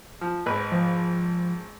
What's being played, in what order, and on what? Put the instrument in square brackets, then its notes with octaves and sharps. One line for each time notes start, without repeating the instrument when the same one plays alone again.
[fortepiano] F3
G#1 B4
[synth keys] F3